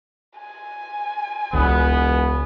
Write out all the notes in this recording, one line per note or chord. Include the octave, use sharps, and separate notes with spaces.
G#5
E1 C#2 B3